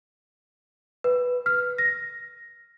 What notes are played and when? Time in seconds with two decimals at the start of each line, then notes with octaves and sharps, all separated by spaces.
1.04 B4
1.46 F6
1.78 A#6